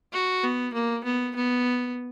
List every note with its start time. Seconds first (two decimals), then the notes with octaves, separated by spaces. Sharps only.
0.13 F#4
0.44 B3
0.74 A#3
1.04 B3
1.36 B3